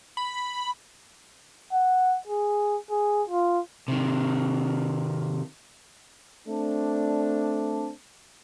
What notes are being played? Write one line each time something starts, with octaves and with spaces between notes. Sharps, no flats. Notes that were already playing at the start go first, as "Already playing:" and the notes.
B5
F#5
G#4
G#4
F4
C3 D#3
A3 C4 D4